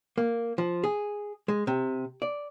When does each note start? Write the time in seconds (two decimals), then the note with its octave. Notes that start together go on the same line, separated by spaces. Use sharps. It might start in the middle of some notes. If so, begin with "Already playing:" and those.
0.18 A#3
0.58 F3
0.84 G#4
1.48 G#3
1.67 C3
2.22 D5